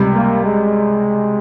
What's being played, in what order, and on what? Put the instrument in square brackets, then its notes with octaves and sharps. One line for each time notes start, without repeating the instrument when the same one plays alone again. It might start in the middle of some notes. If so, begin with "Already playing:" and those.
Already playing: [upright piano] C#2 C3 G3
[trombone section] A#3
G#3